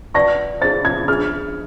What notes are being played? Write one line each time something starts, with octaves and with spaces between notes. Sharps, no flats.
B4 D5 F#5 A5 C#6 A#6
D#4 G#4 C5 A6
G#6
D4 F4 G#4 F6